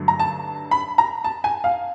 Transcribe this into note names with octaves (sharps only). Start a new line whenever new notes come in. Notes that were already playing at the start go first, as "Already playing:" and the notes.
Already playing: G2 D3 F#3 A3
A#5
A5
B5
A#5
A5
G#5
F5